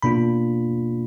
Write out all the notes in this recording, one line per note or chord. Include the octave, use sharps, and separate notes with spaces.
B2 A#3 D4 F4 B5